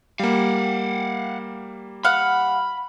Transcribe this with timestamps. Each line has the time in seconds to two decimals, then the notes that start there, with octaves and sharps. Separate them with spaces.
0.19 G3 A#3 F5 F#5
2.05 F5 F#5 B5